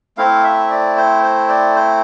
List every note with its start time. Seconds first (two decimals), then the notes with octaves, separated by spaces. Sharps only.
0.18 A3 C4 E4 F5
0.44 E5
0.70 D5
0.97 C5
1.23 C5
1.49 D5
1.75 C5